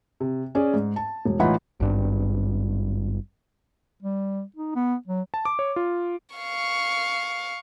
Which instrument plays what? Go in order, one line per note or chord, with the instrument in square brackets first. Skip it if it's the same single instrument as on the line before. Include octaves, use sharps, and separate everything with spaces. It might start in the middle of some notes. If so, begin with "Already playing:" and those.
[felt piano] C3
C#4 G#4 D5
G#2
A5
E1
A1 E3 D#4 F4 F#5 B5
[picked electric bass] G#1 G2
[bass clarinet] G3
D#4
B3
F#3
[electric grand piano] A5
D6
C#5
F4
[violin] F5 C#6